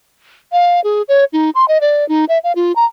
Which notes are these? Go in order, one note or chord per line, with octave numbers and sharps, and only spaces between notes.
F5
G#4
C#5
D#4
C6
D#5
D5
D#4
E5
F5
F4
A#5